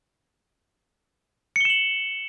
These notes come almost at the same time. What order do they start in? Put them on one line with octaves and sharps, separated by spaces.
C#7 G7 E7 F#7